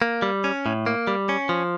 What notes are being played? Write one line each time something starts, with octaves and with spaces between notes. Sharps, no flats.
A#3
G3
C#4
A2
A#3
G3
C#4
F3